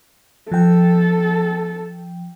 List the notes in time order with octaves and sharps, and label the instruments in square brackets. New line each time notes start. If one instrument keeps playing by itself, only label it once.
[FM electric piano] F3 G5 [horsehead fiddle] A4